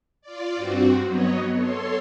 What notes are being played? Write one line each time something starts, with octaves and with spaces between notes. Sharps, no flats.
F4 D5
G2 C4 F#4
F#3 B3 C#5 D#5
A4 C#5 C6